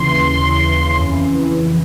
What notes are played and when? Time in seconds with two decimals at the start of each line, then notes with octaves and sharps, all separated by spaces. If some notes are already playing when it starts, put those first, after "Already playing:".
Already playing: D#2 C#3 E3 C6
0.99 F2 C#3 E3